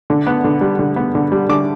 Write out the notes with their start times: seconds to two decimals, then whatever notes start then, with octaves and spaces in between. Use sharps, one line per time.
0.10 D3
0.27 B3
0.44 D3
0.61 G3
0.79 D3
0.96 B3
1.15 D3
1.32 G3
1.49 D3 D6